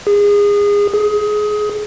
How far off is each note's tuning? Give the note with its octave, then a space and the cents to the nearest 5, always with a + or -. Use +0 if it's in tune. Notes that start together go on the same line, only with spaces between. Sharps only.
G#4 -25
G#4 +20